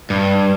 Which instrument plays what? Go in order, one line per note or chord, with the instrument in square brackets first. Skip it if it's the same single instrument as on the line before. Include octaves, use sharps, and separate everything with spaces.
[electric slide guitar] G2